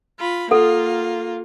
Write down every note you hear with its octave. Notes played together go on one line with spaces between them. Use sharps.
F4 B5
A#3 F4 A4 F#5